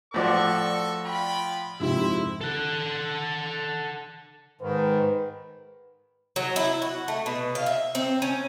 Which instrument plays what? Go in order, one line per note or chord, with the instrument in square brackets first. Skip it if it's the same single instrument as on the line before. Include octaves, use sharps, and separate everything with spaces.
[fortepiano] A2 F3 F#4 [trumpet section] A4 C#6 [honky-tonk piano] D5 D6 A6
[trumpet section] F4 G5 B5
[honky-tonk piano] F2 G#2 C3 [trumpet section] E4
[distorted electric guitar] A4 F#5
[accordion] G#2 D#3 [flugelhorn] B4
[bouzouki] F#3
E4
F#4
A3
B2
F5
E5
C4
C#4